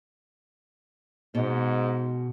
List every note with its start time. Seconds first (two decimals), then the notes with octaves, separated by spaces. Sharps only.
1.35 G#2 B2